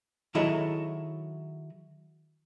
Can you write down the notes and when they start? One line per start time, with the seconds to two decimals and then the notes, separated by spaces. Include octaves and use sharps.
0.35 D#3 F#3 E4 F#4 G#4 A4